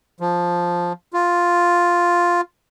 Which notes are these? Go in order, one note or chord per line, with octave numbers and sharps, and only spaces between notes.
F3
F4